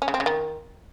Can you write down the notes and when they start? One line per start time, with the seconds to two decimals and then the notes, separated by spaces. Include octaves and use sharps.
0.02 C#4
0.08 C#3
0.14 C4
0.20 C#3
0.26 D#3